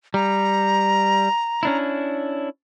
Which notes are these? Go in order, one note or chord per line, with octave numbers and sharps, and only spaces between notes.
G3 A#5
C#4 D4 E4